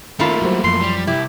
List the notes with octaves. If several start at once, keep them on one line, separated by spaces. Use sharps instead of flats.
D#3 A3 A#3 C#4 E4 F4 A4
F#3 G3 C5
F#2 E3 F3 C6
G3
C2 E4 G4